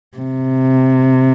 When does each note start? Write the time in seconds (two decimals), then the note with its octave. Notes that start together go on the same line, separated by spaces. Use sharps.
0.17 C3